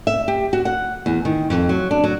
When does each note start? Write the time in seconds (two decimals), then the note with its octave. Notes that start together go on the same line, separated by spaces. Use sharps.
0.07 E5
0.28 G4
0.53 F#4
0.65 F#5
1.06 E2
1.25 D#3
1.50 F2
1.69 F#3
1.91 D4
2.04 F#3